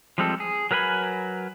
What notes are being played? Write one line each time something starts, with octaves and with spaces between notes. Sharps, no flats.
F3 G3 G#3 C4 A4
G#4
F#3 A#4 B4 G#5 B5